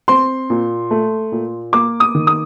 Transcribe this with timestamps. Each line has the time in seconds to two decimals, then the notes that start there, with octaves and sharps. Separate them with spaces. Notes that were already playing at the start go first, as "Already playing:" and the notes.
0.08 C4 C6
0.50 A#2
0.91 A3
1.32 A#2
1.73 A#3 D6
2.00 D#6
2.15 D#3
2.27 D#6